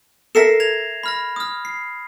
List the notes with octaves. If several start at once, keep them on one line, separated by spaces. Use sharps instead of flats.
A4 A#4 E5 A#6 C7 E7
G#6 A#6 F7
B5 F6 A#6
D#6 F6
C7